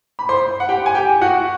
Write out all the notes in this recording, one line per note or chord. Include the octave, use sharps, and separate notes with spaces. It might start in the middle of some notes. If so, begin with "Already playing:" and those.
B5
C5 C6
F#5
G4 G5
G#5
G4 G5
F#4 F#5